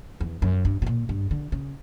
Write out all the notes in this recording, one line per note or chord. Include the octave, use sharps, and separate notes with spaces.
E2
F#2
G2
B2
A#2
G2
D3
C#3